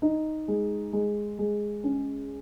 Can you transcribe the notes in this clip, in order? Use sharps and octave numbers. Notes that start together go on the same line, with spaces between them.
D#4
G#3
G#3
G#3
C#4